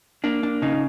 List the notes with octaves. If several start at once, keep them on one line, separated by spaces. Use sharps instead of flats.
A#3 D4
D4
C#3 D#4